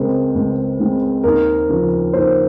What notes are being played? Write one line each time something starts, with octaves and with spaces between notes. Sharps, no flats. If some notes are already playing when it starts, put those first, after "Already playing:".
Already playing: C#2 C#3 G#3 C4 A#4 C5
C#2
C#3 G#3 C4
D#2 A#4
C#3 F3
D#2 C5